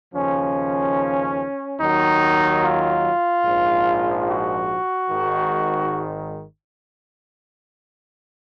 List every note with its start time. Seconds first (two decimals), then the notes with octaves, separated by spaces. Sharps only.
0.13 D#2 C#3 F3 C#4
1.79 D#2 D#3 F#3 D#4
2.62 F4
3.45 A#1 G#2 F3
4.27 F#4
5.10 G#1 G#2 D#3